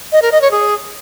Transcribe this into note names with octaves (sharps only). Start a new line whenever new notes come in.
D#5
A#4
D#5
C#5
G#4